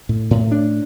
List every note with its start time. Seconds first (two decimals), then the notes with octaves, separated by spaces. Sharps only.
0.09 A2
0.31 A2
0.52 D4